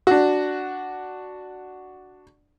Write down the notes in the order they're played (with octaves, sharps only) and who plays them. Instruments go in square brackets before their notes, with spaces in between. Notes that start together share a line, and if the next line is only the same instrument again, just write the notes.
[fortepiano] D4 F#4